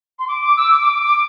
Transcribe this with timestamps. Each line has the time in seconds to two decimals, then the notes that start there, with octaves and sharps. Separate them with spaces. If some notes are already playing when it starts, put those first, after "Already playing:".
0.19 C6
0.28 D6
0.42 D6
0.57 E6
0.71 D6
0.81 D6
0.92 D6
1.03 D6